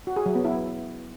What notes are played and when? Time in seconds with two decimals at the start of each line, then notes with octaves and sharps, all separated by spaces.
0.07 F#4
0.16 G#4
0.26 F#3
0.35 B3
0.45 E4